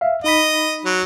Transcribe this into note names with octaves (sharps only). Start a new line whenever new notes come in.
E5 F5
D#4 D#5 B5 B6
F#3